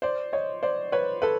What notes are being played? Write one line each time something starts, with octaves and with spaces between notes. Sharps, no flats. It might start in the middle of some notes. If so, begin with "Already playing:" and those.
C5 D5
C#5 D#5
C5 D5
B4 C#5
A4 B4